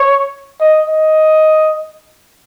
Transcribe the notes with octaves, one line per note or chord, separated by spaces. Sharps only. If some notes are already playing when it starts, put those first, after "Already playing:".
Already playing: C#5
D#5
D#5